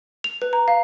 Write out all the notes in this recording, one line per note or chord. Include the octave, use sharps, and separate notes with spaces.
F7
B4
A#5
F5